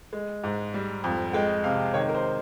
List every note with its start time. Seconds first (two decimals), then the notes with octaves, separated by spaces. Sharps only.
0.13 G#3
0.44 G#2
0.74 G3
1.04 F2
1.33 G#3 G5
1.64 C3 F5
1.94 D#3 C#5
2.09 A#4
2.15 C5